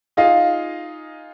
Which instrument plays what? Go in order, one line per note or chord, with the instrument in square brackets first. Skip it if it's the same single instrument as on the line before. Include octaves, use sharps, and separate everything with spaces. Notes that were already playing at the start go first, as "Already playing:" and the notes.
[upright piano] D#4 F4 G#4 D#5 F5